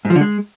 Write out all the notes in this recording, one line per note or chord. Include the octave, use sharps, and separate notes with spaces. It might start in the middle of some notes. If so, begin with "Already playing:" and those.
G#2
F3
D3
G#3